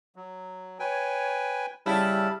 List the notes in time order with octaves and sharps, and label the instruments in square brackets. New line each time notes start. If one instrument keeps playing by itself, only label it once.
[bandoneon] F#3
[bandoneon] B4 G5 G#5 [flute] C#5
[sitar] C#3 E4 [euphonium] G3 [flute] A5 [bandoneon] B5